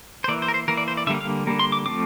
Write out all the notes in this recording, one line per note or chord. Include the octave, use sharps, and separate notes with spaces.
C5
E3 A#3 D5
C5
A#4
C5
E3 A#3 A#4
D5
C5
D5
D3 G3 A#3 E5
F5
D3 G3 A#3
C6
D6
F3 A3 C4 D6